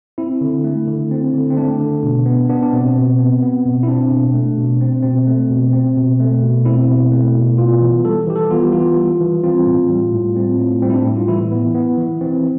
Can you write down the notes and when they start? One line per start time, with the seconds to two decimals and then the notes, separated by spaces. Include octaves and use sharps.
0.18 C4 E4
0.41 D3
0.64 A3
0.88 D3
1.11 C4
1.33 D3
1.50 C4
1.57 A3 D4
1.80 D3
2.03 B2
2.26 B3
2.49 B3 D4
2.63 D4
2.72 B2 C4
2.95 B2
3.19 B3
3.42 B3
3.65 B2
3.83 E4
3.88 C4 D4
4.11 B2
4.34 A3
4.58 B2
4.81 C4
5.02 B2 C4
5.27 A3
5.50 B2
5.73 C4
5.97 B2
6.20 A3
6.43 B2
6.65 C4 E4
6.89 B2
7.12 A3
7.35 B2
7.58 B3 F4
7.81 E3
8.04 G3 A4
8.27 E3 G4
8.36 A4
8.51 B3 F4
8.62 G4
8.72 E3 F4
8.97 G3
9.20 E3
9.44 C4 F4
9.66 A2
9.90 G3
10.13 A2
10.37 C4
10.59 A2
10.82 G3 C4
10.90 E4
10.94 D4
11.05 A2 E4
11.17 F4
11.28 E3 E4
11.52 B3
11.75 B3
11.98 E3
12.21 E3 C4